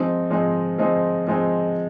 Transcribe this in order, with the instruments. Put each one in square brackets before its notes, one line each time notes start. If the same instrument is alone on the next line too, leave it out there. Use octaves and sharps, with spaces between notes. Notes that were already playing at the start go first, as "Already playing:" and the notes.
Already playing: [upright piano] F3 G#3 C4 D#4
F3 G#3 C4 D#4
F3 G#3 C4 D#4
F3 G#3 C4 D#4